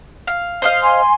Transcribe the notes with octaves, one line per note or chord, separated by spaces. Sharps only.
F5
C5 D#5 F5
G#5 C6